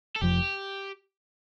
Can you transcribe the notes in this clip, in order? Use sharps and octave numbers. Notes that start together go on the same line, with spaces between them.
A4
F1 F2 F3 G4